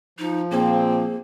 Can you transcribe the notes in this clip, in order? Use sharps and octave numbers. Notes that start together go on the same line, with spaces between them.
F3 D#4
A#2 A#3 C4 G#4